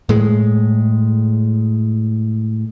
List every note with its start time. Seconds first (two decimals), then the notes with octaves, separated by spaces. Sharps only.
0.09 A2 G#3